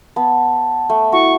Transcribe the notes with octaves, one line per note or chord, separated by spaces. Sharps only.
B3 A5
A3
E4 F#4 C#6